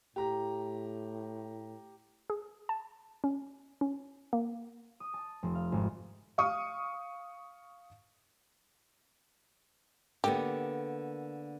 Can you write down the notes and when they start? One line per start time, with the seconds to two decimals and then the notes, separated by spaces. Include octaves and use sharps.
0.16 A2 G4 A#5
2.30 G#4
2.69 A5
3.24 C#4
3.81 C#4
4.33 A#3
5.00 D#6
5.14 A5
5.43 F1
5.55 F5
5.72 G#1
6.38 F5 C#6 D#6
10.24 D3 A#3 B3 G4